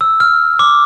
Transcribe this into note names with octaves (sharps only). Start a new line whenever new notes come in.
E6
F6
D6